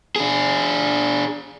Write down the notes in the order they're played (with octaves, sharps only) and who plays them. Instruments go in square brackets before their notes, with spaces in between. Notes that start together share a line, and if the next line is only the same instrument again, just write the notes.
[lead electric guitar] D4 G#4